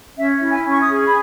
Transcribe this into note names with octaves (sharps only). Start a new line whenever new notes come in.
C#4 E5
E4
G#5
C#4
C#6
D#6
G#4
B5